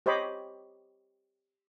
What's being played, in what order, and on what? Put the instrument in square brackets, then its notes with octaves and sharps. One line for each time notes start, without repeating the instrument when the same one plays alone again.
[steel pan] G4 C5 C#5 D#5 B5 D6